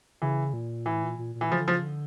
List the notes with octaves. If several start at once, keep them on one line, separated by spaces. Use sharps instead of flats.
C#3 E3
A#2
A2 E3
A#2
A#2
A#2
E3
C#3 F3
D3
C#3 F3
D3